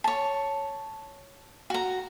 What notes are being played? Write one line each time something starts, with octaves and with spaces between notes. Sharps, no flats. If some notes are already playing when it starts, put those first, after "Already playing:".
C#5 A5
F#4 A#5